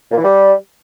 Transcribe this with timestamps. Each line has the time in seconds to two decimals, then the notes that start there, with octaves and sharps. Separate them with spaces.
0.11 A#2
0.18 E3
0.24 G3